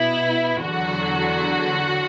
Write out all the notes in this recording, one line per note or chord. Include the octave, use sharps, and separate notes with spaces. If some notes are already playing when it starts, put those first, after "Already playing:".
Already playing: B2 B3 E4
E2 D3 F#3 F#4